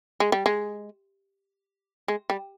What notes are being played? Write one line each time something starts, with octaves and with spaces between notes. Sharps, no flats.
G#3
G3
G#3
G#3
G3